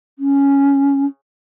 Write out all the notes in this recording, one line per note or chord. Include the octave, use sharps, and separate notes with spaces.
C#4